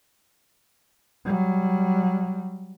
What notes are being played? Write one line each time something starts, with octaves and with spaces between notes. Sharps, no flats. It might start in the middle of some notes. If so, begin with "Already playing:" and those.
F#3 G3